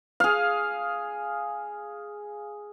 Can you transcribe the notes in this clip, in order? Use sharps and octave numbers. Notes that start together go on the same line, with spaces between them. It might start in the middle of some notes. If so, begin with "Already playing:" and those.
G#4 F5